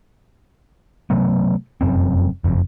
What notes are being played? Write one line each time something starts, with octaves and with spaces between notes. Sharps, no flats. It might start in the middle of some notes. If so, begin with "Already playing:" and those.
C3 F#3 A3 B3
F1 F#2 C4
F#1 F2